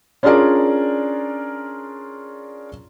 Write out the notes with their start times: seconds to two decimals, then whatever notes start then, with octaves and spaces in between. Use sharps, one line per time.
0.23 C#4 D4 F4 G#4 A#4 D5